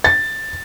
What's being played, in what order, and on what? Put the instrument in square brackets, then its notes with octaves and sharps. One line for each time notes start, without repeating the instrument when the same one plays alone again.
[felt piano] A6